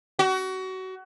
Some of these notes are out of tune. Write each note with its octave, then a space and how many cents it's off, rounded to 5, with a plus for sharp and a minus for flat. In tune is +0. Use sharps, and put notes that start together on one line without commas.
F#4 +25